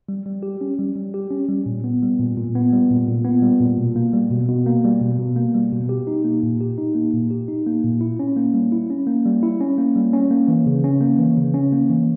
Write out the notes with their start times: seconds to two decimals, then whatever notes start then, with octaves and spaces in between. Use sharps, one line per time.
0.09 G3
0.26 G3
0.43 G4
0.61 C#4
0.79 G3
0.96 G3
1.14 G4
1.31 C#4
1.49 G3
1.66 A#2
1.84 B3
2.03 G3
2.19 A#2
2.38 A#2
2.55 B3
2.73 G3
2.90 A#2
3.08 A#2
3.25 B3
3.42 G3
3.60 A#2
3.78 B2
3.96 A#3
4.13 G3
4.31 B2
4.48 B2
4.66 A#3
4.85 G3
5.01 B2
5.19 B2
5.36 A#3
5.55 G3
5.73 B2
5.89 G4
6.07 D#4
6.24 A#3
6.43 A#2
6.61 G4
6.78 D#4
6.95 A#3
7.14 A#2
7.31 G4
7.48 D#4
7.67 A#3
7.84 A#2
8.01 E4
8.19 C#4
8.37 A#3
8.54 G3
8.72 E4
8.90 C#4
9.07 A#3
9.25 G3
9.43 E4
9.60 C#4
9.78 A#3
9.96 G3
10.13 C#4
10.31 A#3
10.48 E3
10.67 C#3
10.84 C#4
11.01 A#3
11.19 E3
11.37 C#3
11.54 C#4
11.72 A#3
11.90 E3